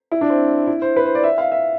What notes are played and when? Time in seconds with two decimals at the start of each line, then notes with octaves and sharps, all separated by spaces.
0.12 E4
0.21 D4
0.30 C4
0.67 E4
0.82 C5
0.96 B4
1.06 C5
1.15 D5
1.23 E5
1.38 F5
1.52 E5